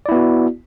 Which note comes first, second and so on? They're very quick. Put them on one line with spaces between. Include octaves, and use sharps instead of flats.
D5 E4 B3 F#4